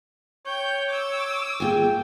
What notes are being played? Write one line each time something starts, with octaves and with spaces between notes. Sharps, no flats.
C#5 G5 G6
D6 E6
A#3 F4 G#4 G5 G#5